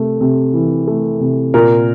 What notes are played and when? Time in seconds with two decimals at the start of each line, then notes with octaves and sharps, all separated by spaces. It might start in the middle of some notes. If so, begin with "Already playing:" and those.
Already playing: C3 A3
0.21 C3
0.54 E3
0.87 A3
1.20 C3
1.54 A#2 A#4